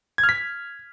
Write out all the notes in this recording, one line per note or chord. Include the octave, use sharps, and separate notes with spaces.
G#6
F6
B6